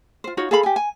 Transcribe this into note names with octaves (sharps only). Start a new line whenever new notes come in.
F4 C5
D#4 F4 F#4 C#5
G#4 A4 F5 B5
G4 G#5
G#5